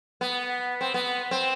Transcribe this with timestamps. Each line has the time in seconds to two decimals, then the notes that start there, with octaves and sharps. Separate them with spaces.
0.21 B3
0.81 C4
0.94 B3
1.31 C4